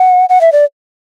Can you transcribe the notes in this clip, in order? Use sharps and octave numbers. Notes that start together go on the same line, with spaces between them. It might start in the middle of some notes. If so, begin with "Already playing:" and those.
Already playing: F#5
F#5
E5
D5